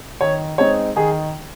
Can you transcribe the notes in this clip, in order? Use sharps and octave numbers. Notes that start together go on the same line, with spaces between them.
D#3 C#5
G#3 C4 D#4 C#5
D#3 G#4